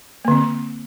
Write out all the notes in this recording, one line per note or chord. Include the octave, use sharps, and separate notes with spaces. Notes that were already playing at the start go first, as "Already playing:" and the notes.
D3 A#3 C4